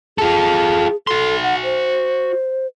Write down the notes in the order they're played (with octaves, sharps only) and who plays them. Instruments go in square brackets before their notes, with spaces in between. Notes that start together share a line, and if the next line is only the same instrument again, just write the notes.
[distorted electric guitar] F4 A4 [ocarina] G#4
[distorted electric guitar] F#4 C6 [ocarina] A4
[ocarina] F#5
C5